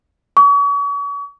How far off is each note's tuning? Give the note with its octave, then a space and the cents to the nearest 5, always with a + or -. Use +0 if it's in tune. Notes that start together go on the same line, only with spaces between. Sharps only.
C#6 +40